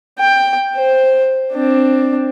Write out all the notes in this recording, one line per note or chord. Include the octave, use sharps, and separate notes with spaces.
G5
C5
C4 D4